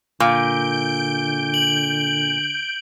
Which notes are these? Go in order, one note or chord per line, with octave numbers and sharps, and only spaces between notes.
A#2 D3 G6 D7
F#7